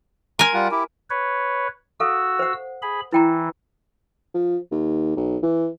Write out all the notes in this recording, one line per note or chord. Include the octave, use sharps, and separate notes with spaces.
A#4 G#5 C6
G3 F4 F#5
E4 G4
B4 C#5
F#4 A4 F5 E6
C5 F#5
G#4 B5
E3 E4 G5 A#5
F3
D#2
B1
E3